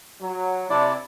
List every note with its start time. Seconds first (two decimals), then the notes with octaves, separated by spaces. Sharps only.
0.20 F#3
0.70 C3 D4 E4 D5